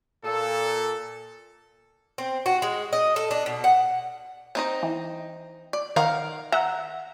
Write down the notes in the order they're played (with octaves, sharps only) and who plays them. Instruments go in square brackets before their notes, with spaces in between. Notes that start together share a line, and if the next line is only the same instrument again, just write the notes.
[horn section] A#2 A4
[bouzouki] C4
F#4
G#3
D#5
A4
D4
B2
F#5
[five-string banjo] C4 D#4 D#5
[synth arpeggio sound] E3
[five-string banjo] D5
[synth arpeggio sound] D#3 [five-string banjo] A#4 F5 F#5
[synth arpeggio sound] E5 F#5 [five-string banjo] A#5